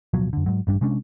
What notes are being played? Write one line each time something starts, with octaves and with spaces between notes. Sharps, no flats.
D1 B2 F3 F#3
F#2 D3
G#2 F#3
A1 G2 G3 D4
C3 G#3 C#4 D4